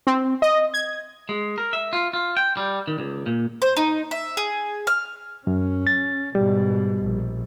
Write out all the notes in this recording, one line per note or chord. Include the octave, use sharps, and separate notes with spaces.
C4
D#5
G#6
G#3
A#4
E5
F4
F4
G5
G3
D#3
C#2
A#2
C5
D#4
E5
G#4
F6
F#2 C#4
A6
G#2 B2 G3
A#1